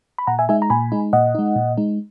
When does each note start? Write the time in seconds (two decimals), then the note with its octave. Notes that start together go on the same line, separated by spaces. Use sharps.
0.18 B5
0.27 A#2 F#5 A#5
0.39 E5 G#5
0.49 G#3 D#4 E5 G#5
0.62 A#5
0.70 A#2 G#5 B5
0.92 G#3 D#4
1.13 A#2 D#5 F#5
1.35 G#3 D#4
1.56 A#2
1.78 G#3 D#4